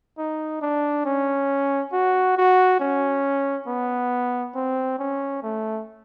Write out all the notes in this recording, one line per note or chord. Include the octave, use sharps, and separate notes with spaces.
D#4
D4
C#4
F#4
F#4
C#4
B3
C4
C#4
A3